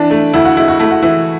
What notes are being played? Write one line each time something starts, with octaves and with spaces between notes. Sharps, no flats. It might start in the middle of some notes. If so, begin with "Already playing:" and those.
Already playing: E3 D4
A3
D2 E4
F#4
G#3 E4
F#4
A3 E4
F#4
E3 E4